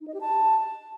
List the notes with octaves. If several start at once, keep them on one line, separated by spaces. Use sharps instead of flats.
D#4
D#5
G4
A5